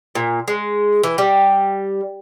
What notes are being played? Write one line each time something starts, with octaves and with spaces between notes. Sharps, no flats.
A#2
G#3
E3
G3